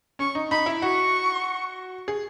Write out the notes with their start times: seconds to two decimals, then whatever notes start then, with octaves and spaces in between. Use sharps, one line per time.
0.19 C#4 C#6
0.35 D#4
0.51 D#4 B5
0.66 E4
0.82 F#4 C#6
2.08 G#4